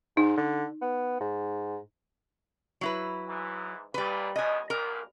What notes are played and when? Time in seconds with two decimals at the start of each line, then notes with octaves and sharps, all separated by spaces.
0.17 G#2 D#4
0.37 D3
0.81 B3
1.20 G#2
2.81 F#3 E4 B4
3.26 G#2 E3
3.94 D#2 A#2 G3 B4
4.36 C#2 F#2 B2 D#5 G#5
4.70 B1 A#2 A#4